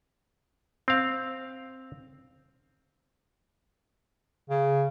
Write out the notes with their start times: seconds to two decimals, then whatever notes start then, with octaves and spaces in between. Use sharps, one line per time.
0.88 C4 F5
4.50 C#3